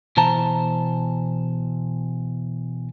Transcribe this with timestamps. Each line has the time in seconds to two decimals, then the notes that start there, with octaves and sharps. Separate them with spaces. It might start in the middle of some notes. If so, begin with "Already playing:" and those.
0.17 B2 E3 C5 A5 A#5